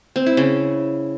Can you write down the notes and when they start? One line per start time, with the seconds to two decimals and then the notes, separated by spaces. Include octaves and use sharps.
0.16 C4
0.26 E4
0.37 C#3